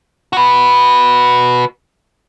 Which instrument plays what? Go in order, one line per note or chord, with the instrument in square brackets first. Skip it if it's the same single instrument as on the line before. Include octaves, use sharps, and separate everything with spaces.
[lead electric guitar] F#4 B4